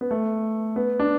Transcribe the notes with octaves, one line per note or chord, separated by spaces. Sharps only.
B3
A3
B3
D4